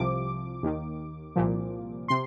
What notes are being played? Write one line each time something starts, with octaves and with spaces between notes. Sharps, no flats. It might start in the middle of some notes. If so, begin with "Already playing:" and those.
Already playing: C2 C3 F3 D6
D#2 D#3
C2 A#2 F3
C3 C6